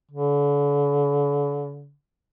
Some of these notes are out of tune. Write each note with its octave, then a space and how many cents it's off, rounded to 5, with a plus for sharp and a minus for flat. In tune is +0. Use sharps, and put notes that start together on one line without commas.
D3 -40